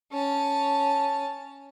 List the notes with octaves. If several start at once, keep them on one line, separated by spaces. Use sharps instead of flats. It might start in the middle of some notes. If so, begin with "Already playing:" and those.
C#4 A5